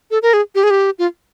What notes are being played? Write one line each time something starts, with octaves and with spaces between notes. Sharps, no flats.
A4
A#4
G#4
G4
G#4
G4
F4